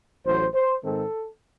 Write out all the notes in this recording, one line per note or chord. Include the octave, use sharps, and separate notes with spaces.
A1 A2 F#3 C5
C5
G#2 D#3 G#3 C4 A4